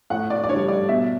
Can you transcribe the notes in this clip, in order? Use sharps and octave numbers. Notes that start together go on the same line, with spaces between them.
A2 F#5
D5
D5
G3 D4 C#5
D5
B2 E5